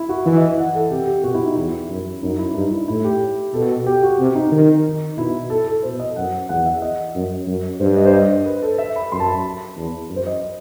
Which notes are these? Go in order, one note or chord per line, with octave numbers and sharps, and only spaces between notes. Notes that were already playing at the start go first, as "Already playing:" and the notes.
Already playing: E4
F#4
E3 E5
D#5
E5
F#5
A4
C3 G4
G4
B2 F#4
E4
D#4
E2 E4
F#2
F#2 D#4
E4
G2 D#4
E4
A2 E4
G4
B2 A4
G4
F#4
C3
D#4
D#3
B2 E4
A4
A4
B2 C5
D#5
F#2 F#5
E2 F#5
E5
D#5
F#2
F#2
G2 C5
D#5
C5
D#5
C5
B4
A4
E5
B5
F#2 C6
A5
B5
E2
F#2
C5
D#5